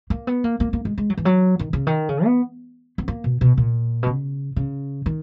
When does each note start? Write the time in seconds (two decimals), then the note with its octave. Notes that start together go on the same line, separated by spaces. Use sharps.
0.10 A#3
0.27 B3
0.44 A#3
0.60 A#3
0.73 A#3
0.85 G#3
0.98 G#3
1.10 F#3
1.17 E3
1.25 F#3
1.59 D#3
1.73 C#3
1.87 D#3
2.09 C#3
2.25 B3
2.98 B3
3.08 A#3
3.24 B2
3.41 B2
3.57 A#2
4.03 B2
4.07 C#3
4.56 C#3
5.06 D#3